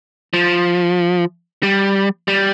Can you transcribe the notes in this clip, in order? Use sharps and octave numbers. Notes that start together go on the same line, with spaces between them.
F3
G3
G3